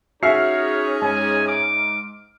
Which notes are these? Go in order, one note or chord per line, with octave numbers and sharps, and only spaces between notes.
C#4 D#4 F#4 G#4 C#5 E5 F6 C7
G#2 G#5
D6